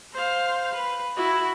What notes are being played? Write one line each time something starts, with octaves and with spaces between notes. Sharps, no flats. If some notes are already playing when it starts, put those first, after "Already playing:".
C5 F5
B4
E4 F#4